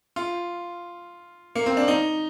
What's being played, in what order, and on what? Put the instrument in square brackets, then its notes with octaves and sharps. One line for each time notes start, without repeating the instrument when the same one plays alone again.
[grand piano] F4
A#3
C4
D4
D#4